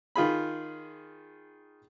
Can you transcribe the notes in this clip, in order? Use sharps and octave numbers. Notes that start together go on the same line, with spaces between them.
D#3 F4 G#4 B5